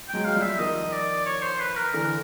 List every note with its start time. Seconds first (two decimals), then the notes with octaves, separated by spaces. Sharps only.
0.08 G5
0.13 F#3 G#3
0.25 G#3 F5
0.36 F3 G3
0.42 E5
0.59 D#3 F3 D#5
0.92 D5
1.26 C#5
1.43 C5
1.60 B4
1.77 A#4
1.93 D3 E3 A#4